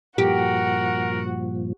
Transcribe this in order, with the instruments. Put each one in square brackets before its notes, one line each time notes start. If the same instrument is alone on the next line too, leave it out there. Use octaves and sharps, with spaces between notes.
[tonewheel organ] G2 A#2 F3 [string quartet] F#4 F#5 [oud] G4 [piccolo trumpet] A#4